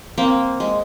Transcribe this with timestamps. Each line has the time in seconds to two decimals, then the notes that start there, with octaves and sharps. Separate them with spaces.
0.18 A#3 C4
0.60 G#3